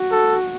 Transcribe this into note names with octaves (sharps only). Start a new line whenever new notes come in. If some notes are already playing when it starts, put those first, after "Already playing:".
Already playing: F#4
A4